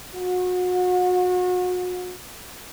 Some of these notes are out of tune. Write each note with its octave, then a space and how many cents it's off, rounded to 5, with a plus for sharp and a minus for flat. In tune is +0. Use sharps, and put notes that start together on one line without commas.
F#4 -35